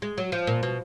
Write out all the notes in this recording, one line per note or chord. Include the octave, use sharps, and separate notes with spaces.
G#3
F#3
F3
A#2
B2